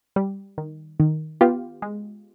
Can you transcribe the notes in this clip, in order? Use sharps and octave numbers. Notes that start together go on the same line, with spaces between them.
G3
D#3
D#3
B3 F4 G4
G#3